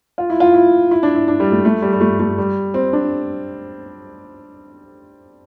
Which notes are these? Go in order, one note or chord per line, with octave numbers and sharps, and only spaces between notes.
F4
E4
F4
E4
E4
D4
E4
D4
G3
A3
A3
G3
G3
A3
A3
G3
C4
D4